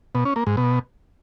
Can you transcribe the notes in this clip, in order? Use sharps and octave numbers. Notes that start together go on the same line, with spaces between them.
B2
C#4
A#3
G#2
B2